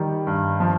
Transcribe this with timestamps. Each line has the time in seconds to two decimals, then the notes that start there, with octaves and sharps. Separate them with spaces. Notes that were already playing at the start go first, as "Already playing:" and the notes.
Already playing: D#3 G3
0.27 G2
0.60 F3